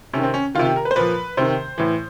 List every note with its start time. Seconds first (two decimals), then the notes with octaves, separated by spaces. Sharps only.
0.13 C3 D#3 C#4
0.23 C4
0.34 C#4
0.55 C3 D#3 F4
0.65 G4
0.76 A#4
0.85 B4
0.91 C5
0.96 A#2 F3 B4
1.37 C3 D#3 C5
1.78 A2 E3